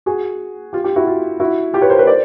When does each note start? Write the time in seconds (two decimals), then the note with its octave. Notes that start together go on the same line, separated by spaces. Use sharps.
0.06 F#4 G#4
0.73 F4 G4
0.84 F4 G4
0.96 E4 F#4
1.07 F4
1.40 E4 F#4
1.74 F4 G4
1.82 B4 C#5
1.90 A#4 C5
1.99 B4 C#5
2.07 C5 D5